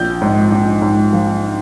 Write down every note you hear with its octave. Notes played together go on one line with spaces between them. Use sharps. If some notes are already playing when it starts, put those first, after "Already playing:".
Already playing: A#1 G6
G#2
A#1
G#2
F3